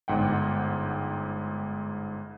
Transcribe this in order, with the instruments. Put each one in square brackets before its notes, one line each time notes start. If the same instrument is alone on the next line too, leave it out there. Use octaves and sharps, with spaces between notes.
[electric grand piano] G1 G#2 F#5 G5